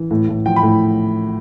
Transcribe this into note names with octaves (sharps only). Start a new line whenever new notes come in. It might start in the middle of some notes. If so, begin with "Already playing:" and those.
Already playing: E3
A2
A2
F3 G5
B5
A2